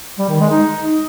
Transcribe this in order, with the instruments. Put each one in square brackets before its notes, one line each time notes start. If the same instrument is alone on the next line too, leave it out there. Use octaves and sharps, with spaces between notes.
[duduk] G3
D#3
G#3
D#4